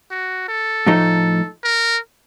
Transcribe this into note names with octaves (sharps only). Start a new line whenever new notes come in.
F#4
A4
A2 F3 A3 D#4
A#4